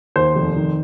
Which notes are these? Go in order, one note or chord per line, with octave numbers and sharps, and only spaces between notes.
D#2 C5
F1
D#3